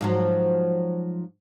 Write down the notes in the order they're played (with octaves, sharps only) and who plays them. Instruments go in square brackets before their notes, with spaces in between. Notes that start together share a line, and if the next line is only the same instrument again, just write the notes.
[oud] G#2 F3 F#3